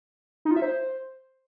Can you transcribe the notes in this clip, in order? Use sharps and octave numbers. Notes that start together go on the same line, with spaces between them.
D#4
F4
E5
C5